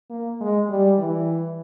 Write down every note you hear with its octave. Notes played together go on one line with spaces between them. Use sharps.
A#3
G#3
G3
E3